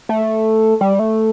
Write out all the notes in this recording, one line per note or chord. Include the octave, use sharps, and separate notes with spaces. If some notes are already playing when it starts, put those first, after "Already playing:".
A3
G3
A3